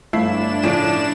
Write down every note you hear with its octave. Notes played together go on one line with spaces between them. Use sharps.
G1 A3 D4 E4 F5 C7 E7
A2 C#3 F3 D5 D7